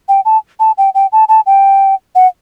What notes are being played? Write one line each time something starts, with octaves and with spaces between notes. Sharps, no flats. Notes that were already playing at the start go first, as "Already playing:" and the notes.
G5
A5
A5
G5
G5
A5
A5
G5
F#5